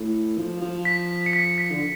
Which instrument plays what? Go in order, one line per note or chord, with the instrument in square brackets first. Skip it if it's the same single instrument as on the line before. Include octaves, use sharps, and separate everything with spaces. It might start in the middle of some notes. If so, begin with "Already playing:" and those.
Already playing: [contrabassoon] A2
F3
F3
[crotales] B6
C#7
B6
B6
[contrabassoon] D3